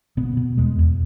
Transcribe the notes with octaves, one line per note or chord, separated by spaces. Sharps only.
B2 B3
B2
E2 G#3
E2